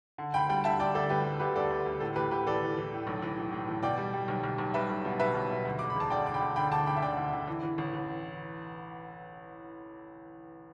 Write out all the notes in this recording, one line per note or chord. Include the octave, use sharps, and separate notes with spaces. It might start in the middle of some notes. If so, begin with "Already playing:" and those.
D3
D2 G5 B5
G3 G5 B5
D3 E5 A5
D3 D5 G5
D2 A4 D5
G3 G4 B4
G3
D2 G4 B4
D3 A4 D5
D2
D2
A2 A4
E3 G4 B4
A2 G4 B4
E3 A4 D5
E3
E3
A2
B1
E3
E3
A2
E3
B2 D5 G5
G3
G3
B1
B1
B1
G3 B4 E5
B1
B2
B2 B4 E5
B1
B2
D2
E1 D6
B5
E1 A5
D3 D5 G5
D3 D6
G5 B5
D3
D3 G5 B5
D2 A5 D6
D2 G5 B5
E5
D3 D5 G5
D3
D3
E3
E3
A1
E3